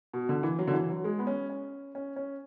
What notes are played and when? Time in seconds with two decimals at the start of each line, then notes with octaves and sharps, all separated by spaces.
0.14 B2
0.29 D3
0.43 E3
0.59 F#3
0.67 D3
0.73 E3
0.90 F#3
1.04 G#3
1.19 B3
1.27 C#4
1.50 C#4
1.95 C#4
2.16 C#4